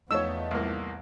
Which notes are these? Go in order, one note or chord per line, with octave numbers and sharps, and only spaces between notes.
E2 F3 A3 B3 D#4 C#5 E6
C2 A2 A#3